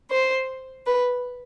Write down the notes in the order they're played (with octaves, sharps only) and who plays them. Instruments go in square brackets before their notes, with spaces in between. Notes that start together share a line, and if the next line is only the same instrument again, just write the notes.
[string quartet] C5
B4